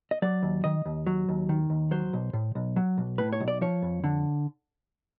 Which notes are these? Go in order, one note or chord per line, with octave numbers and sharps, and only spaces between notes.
D#5
F#3 D5
D#2
D#3 D#5
D#2
F#3
D#2
D#3
D#2
F#3 C5
B1
A2
B1
F#3
B1
A2 B4
C#5
B1
D5
F3 C#5
F2
D3